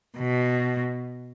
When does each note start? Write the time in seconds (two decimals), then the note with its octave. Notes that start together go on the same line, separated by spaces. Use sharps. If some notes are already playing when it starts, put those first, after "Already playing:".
0.18 B2